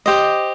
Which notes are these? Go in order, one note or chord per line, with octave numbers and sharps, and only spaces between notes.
G4 C5 D#5